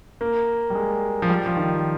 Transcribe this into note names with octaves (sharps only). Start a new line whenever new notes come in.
A#3
G3
G#3
F3
G3
F3
D#3